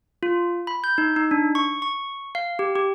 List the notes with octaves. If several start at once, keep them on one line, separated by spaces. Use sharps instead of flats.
F4
B5
G6
D#4
D#4
D4
C#6
C#6
F5
G4
G4